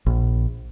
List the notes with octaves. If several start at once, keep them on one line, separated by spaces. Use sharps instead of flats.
A#1